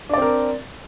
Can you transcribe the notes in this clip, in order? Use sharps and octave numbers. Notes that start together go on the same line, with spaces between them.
C4 D4 A#4 D5